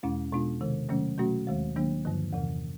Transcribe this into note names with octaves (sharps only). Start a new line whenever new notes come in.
E2 B2 G#3 C#4 E4
B2 G#3 B3 D4 F4
C3 D#3 G#3
C3 D#3 F#3 A3 C#4
B2 F#3 A3 C#4 F#4
D#2 D#3 G#3
D#3 F#3 A#3 D4
G2 D3 F3
E2 C3 E3